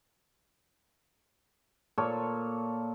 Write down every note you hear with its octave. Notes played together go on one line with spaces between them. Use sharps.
A#2 A4 C#5